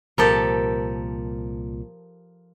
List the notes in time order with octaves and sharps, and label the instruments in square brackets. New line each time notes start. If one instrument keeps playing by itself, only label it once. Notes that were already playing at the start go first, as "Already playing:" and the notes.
[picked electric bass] C2 A#2 [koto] F3 G4 A4 [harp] A#4